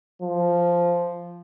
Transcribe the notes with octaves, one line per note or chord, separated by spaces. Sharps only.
F3